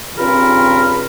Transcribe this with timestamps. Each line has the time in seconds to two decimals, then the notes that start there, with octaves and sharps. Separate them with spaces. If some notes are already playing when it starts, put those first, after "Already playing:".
0.18 G2 C#3 C4 F4 A#4 B5